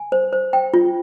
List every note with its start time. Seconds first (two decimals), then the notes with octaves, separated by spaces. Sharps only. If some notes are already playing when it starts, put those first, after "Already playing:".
Already playing: G#5
0.12 C5
0.33 C5
0.53 G5
0.74 F4